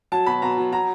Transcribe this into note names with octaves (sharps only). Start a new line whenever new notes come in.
F#3 A5
B2 B5
B2 A#5
F#3
F#3 A#5